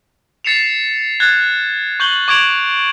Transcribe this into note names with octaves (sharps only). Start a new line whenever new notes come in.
A6 C7 C#7 E7 F7
F#6 G#6 A6
C#6 G6 F#7 G7
C#6 D6 G#6 D7 F7 F#7